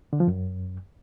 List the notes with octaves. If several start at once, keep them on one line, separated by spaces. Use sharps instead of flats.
D3
F3
F#2